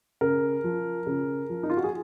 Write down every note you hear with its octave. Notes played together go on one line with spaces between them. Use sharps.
C#3 A#4
F3
C#3
F3
D#4
F4
F#4
G#4